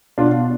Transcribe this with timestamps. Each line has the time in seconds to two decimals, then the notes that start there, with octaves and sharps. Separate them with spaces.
0.18 B2 D4 F4